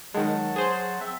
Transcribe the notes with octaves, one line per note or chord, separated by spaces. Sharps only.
D#3 F#3 G#3 F#5 A5
G#4 C5
C4 E5